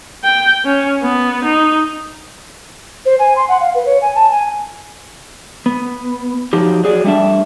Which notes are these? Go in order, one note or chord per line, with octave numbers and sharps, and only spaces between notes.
G5
C#4
B3
D#4
C5
G#5
C6
F#5
F5
B4
C#5
G#5
A5
G#5
B3
F3 F#3 D#4 G4
F#3 G#4 D5
G3 A3 D4 E5